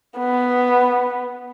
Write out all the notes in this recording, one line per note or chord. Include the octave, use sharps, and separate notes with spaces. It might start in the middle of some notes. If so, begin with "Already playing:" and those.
B3